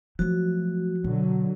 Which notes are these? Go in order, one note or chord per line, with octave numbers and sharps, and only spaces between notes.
F3 F#3 A3 F#4
B2 D3 F#3